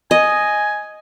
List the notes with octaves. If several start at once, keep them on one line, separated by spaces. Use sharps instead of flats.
D#5 G#5